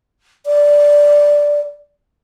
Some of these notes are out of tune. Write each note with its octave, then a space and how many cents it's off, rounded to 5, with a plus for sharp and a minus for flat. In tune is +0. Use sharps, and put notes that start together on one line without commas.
D5 -5